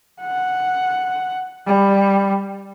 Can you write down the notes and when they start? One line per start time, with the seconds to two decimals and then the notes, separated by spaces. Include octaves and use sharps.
0.22 F#5
1.67 G3